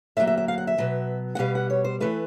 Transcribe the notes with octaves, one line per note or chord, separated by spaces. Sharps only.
D2 D3 F#3 A#3 E5
E5
E5
F5
F#5
E5
B2 F#3 B3
F#5
B2 G3 B3 F5
F#5
C#5
C5
C#3 E3 A3 B4